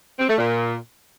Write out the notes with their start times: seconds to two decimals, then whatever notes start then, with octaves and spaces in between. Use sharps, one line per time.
0.19 C4
0.28 A3
0.38 A#2